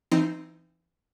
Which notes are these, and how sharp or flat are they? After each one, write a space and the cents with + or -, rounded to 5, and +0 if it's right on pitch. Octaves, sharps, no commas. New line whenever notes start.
E3 +35 C4 +0 D#4 +0